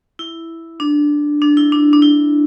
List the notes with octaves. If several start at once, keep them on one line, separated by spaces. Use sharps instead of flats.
E4
D4
D4
E4
D4
D4
E4